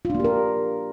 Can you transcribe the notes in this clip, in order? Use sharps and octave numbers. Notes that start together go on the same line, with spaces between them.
A#3 D4 F4 G4 A#4